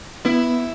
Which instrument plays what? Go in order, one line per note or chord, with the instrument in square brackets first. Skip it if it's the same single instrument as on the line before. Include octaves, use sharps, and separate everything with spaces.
[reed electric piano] B3 [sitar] E4